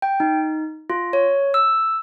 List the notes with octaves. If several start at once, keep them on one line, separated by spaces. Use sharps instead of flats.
G5
D#4
F4
C#5
E6